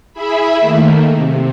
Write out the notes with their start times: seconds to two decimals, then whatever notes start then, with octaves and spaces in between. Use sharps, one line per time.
0.13 E4 G#4 E5 B5
0.60 D#3 A3 A#3
1.14 C3